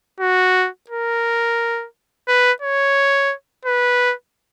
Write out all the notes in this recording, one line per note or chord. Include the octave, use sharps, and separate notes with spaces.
F#4
A#4
B4
C#5
B4